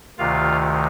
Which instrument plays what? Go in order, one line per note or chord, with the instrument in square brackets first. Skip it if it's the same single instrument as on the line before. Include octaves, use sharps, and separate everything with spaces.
[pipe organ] D2 C3 D#3 F4 F5